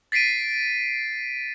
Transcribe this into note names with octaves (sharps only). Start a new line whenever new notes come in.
A6 B6 C7 D7 D#7